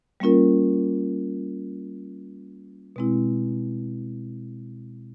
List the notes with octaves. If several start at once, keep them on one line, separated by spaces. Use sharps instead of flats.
G3 A#3 C#4 F4 A#4
B2 G#3 C4 E4